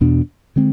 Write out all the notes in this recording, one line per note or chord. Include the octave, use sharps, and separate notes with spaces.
E2 B2 B3 D4
D3 G#3 C4